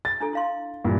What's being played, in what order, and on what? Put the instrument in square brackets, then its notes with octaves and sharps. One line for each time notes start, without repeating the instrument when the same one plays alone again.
[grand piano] A6
[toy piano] D4 F4 A4
E4 F5 C6
[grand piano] G2 A#2 E3